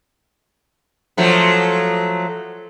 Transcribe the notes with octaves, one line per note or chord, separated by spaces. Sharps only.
F3 F#3 A3